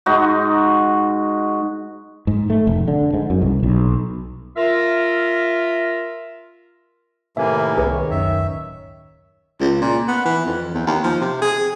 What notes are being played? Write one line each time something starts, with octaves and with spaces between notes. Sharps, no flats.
G#2 D#4 F#4
G#2
A3
F1
D3
G#2
F#2
C2
B1
F4 A#4 E5
A2 C3 D#3 A#3 B4 E5 G#5
C2 D#3 G#4 B4 C#5
D1 F#2 C#4 E5
C#2
A#2
B3
E3
F2
E2
D#2
F3
C3
G#4